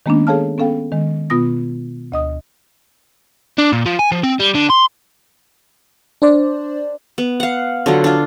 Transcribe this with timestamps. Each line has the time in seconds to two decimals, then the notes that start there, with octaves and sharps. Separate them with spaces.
0.06 D#3 G#3 A#3 B3 C#4 D4
0.27 G#4 A4 C#5 F5 A5 F6
0.58 B3 C#4 A4 F5 G5
0.92 D#3 G#3
1.30 B2 B3 F4 D#6 A#6
2.12 D2 D#5 D#6
3.58 D4
3.72 A#2
3.86 F3
3.99 G#5
4.12 F3
4.23 C4
4.40 G3
4.54 D3
4.70 C6
6.22 D4 C5 D5
7.18 B3
7.40 F5 F#5
7.86 D3 F#3 F4
8.04 D4 F4